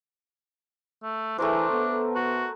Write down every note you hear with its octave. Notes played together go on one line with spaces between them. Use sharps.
A3
E3 A3 D4 G#4 A#4 C5
B3 A4
F#4